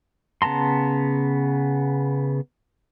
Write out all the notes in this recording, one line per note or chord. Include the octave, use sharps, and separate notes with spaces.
C#3 B3 A5 A#5 C6